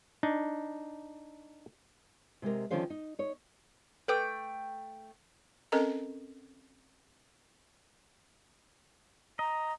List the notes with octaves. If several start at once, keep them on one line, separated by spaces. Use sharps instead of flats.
D4 D#4
C3 G#3 G4 A#4
D3 D#3 F3 C#4 C5 F5
D#4
D#4 C#5
A3 A4 B4 G5 D6
C4 C#4 A4 A#4 D#5 A#5
D#5 A#5